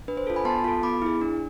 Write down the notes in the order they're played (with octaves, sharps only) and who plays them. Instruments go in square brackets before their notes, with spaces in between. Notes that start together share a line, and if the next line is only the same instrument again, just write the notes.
[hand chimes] D4 B4
C5
F4 A4
G#5 B5
B3 A5 C6
F4 A4
B3 B5 D6
E4 G#4
D4